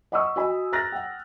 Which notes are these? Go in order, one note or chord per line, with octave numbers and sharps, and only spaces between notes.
D#5 F#5 B5 C#6 D#6 E6
F#4 D#5 G#5 B5
A#5 F6 F#6 A6 A#6
F#5 G5